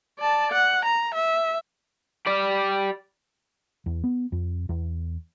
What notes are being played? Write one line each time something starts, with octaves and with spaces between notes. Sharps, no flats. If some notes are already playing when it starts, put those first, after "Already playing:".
D5 A5
F#5
A#5
E5
G4 D5
E2
B3
F2
E2